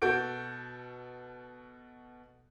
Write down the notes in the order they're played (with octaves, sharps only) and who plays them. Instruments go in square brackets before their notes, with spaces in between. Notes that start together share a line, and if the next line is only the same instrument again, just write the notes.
[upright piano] B2 F#4 A4 G6 D7